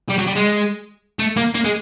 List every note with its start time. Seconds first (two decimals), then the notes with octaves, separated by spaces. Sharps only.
0.09 G3
0.18 F#3
0.27 G3
0.36 G#3
1.19 A3
1.37 A#3
1.55 A#3
1.65 G#3